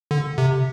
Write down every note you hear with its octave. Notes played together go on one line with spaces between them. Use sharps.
D3
C3